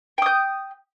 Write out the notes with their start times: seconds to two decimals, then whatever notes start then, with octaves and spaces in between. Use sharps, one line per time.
0.18 G5
0.22 D#6
0.26 G6